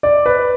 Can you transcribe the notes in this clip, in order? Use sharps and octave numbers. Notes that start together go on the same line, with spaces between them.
D5
B4